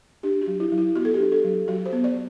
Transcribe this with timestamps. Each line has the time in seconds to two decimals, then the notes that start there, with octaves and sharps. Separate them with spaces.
0.23 D4 G4
0.41 F#4
0.47 F#3
0.60 E4
0.72 F#3
0.78 E4
0.96 B3 F#4
1.05 A4
1.14 G4
1.20 D4
1.32 A4
1.44 F#3
1.68 F#3 F#4
1.86 C5
1.93 B3
2.04 D5